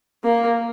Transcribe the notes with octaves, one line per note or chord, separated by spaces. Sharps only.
A#3